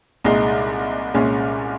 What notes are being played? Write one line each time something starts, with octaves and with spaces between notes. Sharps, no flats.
C2 A#2 G#3 D#4
C2 A#2 G#3 C#4